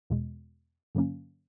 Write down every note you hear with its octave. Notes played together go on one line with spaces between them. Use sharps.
E2 B2 G#3
G2 D3 F#3 A#3 C#4